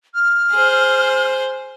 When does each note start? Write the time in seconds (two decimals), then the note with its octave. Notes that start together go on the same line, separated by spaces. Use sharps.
0.15 F6
0.52 G#4 C5